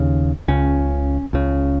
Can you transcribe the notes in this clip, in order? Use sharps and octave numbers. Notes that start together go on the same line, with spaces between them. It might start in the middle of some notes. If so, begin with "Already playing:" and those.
Already playing: D#2 C#3
C#2 C#3 C#4
C#2 C#3